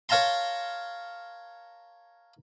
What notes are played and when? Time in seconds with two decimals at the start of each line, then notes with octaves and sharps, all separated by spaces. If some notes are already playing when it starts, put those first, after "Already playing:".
0.09 A#4 C#5 F5 A5 A#5 C6